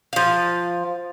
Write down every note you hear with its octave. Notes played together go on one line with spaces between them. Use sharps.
F3 F5